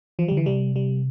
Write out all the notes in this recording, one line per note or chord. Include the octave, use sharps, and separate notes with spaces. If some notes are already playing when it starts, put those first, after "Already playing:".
E3 F3
G3
D3
E3
C3 G3
G3